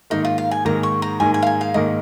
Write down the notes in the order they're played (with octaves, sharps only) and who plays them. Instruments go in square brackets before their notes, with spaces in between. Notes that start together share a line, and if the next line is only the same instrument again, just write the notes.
[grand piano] G#2 D#3 A#3 [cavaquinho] D#4
[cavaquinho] F4
F5
G#5
[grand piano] G#2 D#3 A#3 [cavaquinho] A#5
[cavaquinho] C#6
A#5
[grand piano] G#2 D#3 A#3 [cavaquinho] G#5
[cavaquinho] G#5
F5
G#5
F5
[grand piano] G#2 D#3 A#3 [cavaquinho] D#5